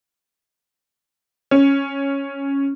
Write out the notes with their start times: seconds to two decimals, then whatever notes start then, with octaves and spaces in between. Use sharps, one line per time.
1.51 C#4